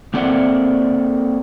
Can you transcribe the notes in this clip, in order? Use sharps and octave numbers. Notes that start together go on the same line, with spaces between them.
A#3 C4 A4 D5 E5 F#5